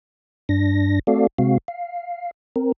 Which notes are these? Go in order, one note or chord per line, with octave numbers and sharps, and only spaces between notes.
G2 D4 A#6
A3 C4 F#4 A4 D5 F5
C3 G#3 C4 F#4 F5
F5
C4 A#4